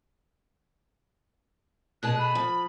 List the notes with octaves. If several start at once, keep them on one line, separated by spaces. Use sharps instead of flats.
B2 G#4 A5 F#6
B5
F3